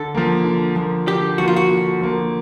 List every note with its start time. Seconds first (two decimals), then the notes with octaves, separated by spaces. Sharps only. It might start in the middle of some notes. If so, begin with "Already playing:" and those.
Already playing: D3 A4
0.15 F3 A#3
0.45 D3
0.76 F3 A#3
1.07 D3 G4
1.38 F3 A#3 F#4
1.48 F4
1.56 F#4
1.70 D3
2.01 F3 A#3